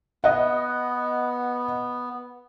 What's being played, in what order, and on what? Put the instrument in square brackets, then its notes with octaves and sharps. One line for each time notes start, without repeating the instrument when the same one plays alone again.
[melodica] B3 [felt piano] D#5 F#5